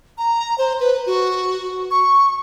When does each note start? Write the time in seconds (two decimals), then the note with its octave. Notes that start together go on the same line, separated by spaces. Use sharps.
0.18 A#5
0.58 C5
0.80 B4
1.06 F#4
1.91 C#6